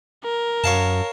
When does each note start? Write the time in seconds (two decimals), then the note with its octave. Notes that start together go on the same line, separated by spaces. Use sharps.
0.24 A#4
0.64 F#2 C#5 F5 A5